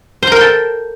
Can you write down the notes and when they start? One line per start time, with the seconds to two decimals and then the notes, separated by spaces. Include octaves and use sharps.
0.23 C5
0.27 A#5
0.32 A#4
0.36 G5
0.41 A4